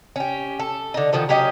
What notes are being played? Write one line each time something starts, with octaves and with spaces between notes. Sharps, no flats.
C#4 G4
A4
D3 D#4
D3 D#3 F3 A4
F#3 C#4 G4 D#5